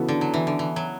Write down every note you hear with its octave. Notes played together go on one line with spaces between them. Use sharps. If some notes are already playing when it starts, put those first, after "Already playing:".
Already playing: C#3 E3 B3 F#4 A4
D3
F#3
E3
D3
E3
F#3